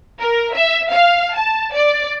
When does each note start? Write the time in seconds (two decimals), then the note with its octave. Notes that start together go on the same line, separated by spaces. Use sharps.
0.19 A#4
0.53 E5
0.91 F5
1.35 A5
1.74 D5